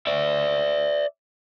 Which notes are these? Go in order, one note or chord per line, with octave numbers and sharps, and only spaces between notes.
D5 E5